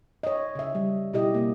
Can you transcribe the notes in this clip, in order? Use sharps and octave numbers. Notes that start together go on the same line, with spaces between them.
C#5 D#5
C#3 E5
G3
B2 E4 G4 D#5
A#3 C4